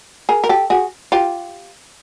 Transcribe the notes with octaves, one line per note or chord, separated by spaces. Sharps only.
G#4 A#4
A#4
G4 A4
F#4 G#4
F4 G4